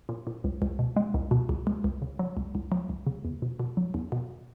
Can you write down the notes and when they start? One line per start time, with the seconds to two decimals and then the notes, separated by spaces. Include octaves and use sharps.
0.09 A#2
0.27 A#2
0.44 C#2
0.62 C#2
0.79 B2
0.96 G#3
1.14 C#2
1.31 B2
1.49 C#2
1.67 G#3
1.84 C#2
2.02 C#3
2.19 F#3
2.37 C#2
2.55 C#2
2.72 F#3
2.89 C#2
3.07 C#3
3.25 E2
3.42 B2
3.60 B2
3.77 F#3
3.94 E2
4.12 B2